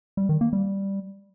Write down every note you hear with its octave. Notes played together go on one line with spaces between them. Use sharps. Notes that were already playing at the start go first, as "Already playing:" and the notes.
G3
D#3
A#3
G3